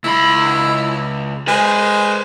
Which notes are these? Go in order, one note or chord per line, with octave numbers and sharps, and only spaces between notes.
C#2 E4 B5
G#3 B4 C5